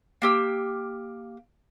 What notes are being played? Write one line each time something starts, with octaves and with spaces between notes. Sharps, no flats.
A#3 G4 E6